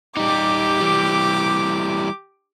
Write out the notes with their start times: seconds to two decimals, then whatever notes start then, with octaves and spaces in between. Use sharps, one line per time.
0.17 G3 D#4 G4 D6
0.81 E3 G3